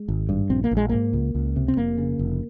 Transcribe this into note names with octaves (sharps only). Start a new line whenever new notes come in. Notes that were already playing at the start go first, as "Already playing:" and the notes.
Already playing: G#3
G#1
G2
A#1 C4
A#3
A#1
G#3
G#2 A#3
C#2
C#2
C3
C4
F1 A#3
C#3
F1